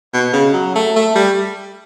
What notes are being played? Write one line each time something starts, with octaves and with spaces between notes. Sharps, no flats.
B2
C#3
F#3
A3
A3
G3